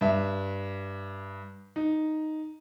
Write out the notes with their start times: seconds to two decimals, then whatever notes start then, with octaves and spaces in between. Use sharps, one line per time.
0.01 G2 E5
1.76 D#4